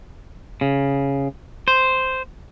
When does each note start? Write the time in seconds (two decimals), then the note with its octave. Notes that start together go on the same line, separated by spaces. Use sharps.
0.61 C#3
1.68 C5